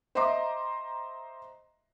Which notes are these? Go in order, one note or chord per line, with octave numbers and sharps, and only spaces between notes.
C5 D#5 E5 A#5 C6 D6